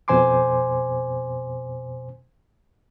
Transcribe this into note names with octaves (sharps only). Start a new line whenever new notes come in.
F2 B2 C5 G#5 C6 D6